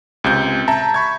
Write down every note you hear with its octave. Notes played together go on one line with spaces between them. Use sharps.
C#2 C3 G6
E5 A5 A#5
B5 C#6 G#6